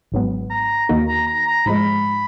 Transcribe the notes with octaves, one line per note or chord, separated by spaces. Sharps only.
G#1 G#2 F#3 B3
A#5
D#2 D#3 A#3 D#4 F#4
A#5
A#5
A#5
G#2 F3 G#3 B5